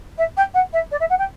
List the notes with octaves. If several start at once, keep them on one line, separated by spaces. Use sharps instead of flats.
E5
G5
F#5
E5
D5
E5
F#5
G5